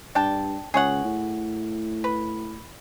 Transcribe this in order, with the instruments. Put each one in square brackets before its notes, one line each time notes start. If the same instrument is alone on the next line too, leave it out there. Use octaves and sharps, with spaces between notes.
[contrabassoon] G2 [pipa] D4 G5 A5
[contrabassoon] C#2 [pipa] G#4 C#5 F#5
[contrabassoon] A2
[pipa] B4